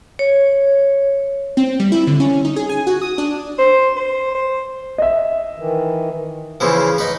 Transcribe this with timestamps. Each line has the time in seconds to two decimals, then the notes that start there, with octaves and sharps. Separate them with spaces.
0.19 C#5
1.57 C4
1.80 G3
1.92 E4
2.07 D3
2.20 C#4
2.45 D#4
2.56 G#4
2.69 G#5
2.87 F#4
3.02 D#6
3.18 D4
3.58 C5
3.96 C5
4.35 C5
4.98 D#5 E5
5.59 D#3 E3
6.60 C#3 E3 F3
6.98 D#4 B4